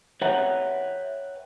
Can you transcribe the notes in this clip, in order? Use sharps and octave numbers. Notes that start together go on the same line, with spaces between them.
B4 C#5 E5 F#5 G5 A#5